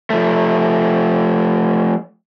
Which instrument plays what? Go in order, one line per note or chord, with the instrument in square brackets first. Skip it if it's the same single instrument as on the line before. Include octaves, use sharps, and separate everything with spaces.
[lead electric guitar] F3 A3